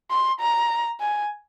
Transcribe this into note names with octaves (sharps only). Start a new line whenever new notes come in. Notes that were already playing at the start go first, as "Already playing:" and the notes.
C6
A#5
G#5